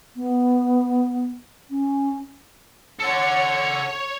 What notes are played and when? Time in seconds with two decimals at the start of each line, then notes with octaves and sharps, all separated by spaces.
0.16 B3
1.70 C#4
2.99 A4 C#5 F#5 C#7